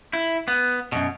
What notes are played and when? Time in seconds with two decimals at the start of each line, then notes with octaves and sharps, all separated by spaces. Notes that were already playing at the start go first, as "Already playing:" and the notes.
0.13 E4
0.48 B3
0.92 F#2 B2